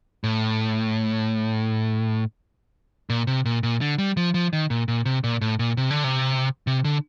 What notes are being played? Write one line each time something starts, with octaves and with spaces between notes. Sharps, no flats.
A2
A#2
C3
A#2
A#2
D3
G3
F3
F3
D#3
A#2
A#2
C3
A#2
A2
A#2
C3
D3
C3
C3
D3